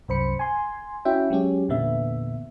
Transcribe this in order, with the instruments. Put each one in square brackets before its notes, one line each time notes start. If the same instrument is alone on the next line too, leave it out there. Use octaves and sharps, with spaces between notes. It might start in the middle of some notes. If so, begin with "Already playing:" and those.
[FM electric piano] C2 F#2 C5 B5 C#7
G#5 C6
C#4 E4 F#4 E5 G5
F#3 G#3 C#4 G4
E2 A#2 D3 B3 E5